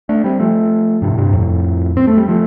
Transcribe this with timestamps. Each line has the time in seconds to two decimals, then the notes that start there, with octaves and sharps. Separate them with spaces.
0.09 A3 D4
0.24 G3 C4
0.40 F3 A3
1.02 G2 C3
1.11 A2
1.18 G2 C3
1.33 F2 A2
1.97 C4
2.07 A3
2.17 G3
2.28 F3 A3